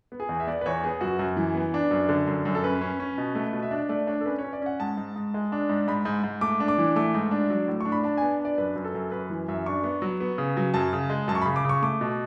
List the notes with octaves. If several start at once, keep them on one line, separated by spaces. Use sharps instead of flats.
B3
G#4
E2
E5
B3 D5
B4
E2 C#5
B3 G#4
F#2 F#4
F#2
E3
B3
D4
F#2
D3
F#2
F#2
A4
C#4 B4
C#4
C#4
B2
A3
B2
E5
D4 D5
A3 D5
D4 C#5
A4
C#4 B4
C#5
C#4
D5
C#4 F#5
G#2 A5
G#2
G#2
G#3
D4
G#2
G#2 B5
G#2
G#2
A3 D6
D4
D6
E3
A3 D6
G#2
D4
F#3
A2
D4 C#6
B5
D4 A5
B3 G#5
D4 D5
F#2 B4
F#2
A4
F#2
F#2 B4
E3
F#2 E5
D4 C#6
B3
F#3
B3
C#3
F#3
F#2 A5
C#3
G#3
F#2 A5
C#6
C#3 B5
D6
C#3 C#6
A3 D6
B2